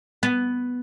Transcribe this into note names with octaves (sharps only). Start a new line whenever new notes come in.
B3